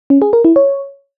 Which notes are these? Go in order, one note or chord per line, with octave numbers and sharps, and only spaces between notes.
C#4
G#4
A#4
E4
C#5